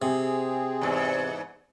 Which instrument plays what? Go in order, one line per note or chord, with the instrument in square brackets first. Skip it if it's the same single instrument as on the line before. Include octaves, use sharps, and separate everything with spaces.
[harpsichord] C3 [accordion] C4 G#4
[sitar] E2 G#2